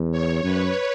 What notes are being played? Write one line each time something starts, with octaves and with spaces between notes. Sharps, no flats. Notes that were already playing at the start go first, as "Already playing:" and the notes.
Already playing: E2
C#5
F#2 B4